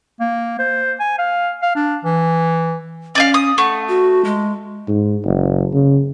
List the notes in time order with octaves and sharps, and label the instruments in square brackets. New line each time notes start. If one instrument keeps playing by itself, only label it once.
[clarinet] A#3
C5
G#5
F5
F5
D4
E3
[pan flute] C#4 [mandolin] D5 D#5 F5
[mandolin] D#6
[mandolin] A3 [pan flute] F#5
[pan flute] F#4
G#3
[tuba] G#2
F#1
C#3